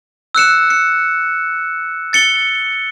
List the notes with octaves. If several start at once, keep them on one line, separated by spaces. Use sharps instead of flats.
E6 F#6 C#7 E7
C#7
A6 C#7 G7